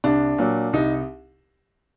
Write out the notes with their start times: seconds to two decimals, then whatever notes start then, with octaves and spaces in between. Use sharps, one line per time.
0.04 C2 D4
0.38 A#2 F#3
0.73 C2 D#4